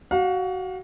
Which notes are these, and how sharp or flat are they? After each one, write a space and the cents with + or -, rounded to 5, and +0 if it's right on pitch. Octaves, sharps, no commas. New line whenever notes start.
F#4 +20 F5 +40